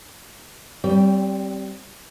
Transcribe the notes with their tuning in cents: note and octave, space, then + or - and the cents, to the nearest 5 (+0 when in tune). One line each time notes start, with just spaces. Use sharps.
G3 -15 C4 +5 C#5 +30